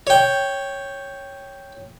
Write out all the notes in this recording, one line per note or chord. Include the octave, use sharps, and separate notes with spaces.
C#5 G5